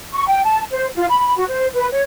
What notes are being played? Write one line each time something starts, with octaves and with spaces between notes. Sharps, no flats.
C#6
G5
A5
C5
F4
B5
F#4
C5
B4
C#5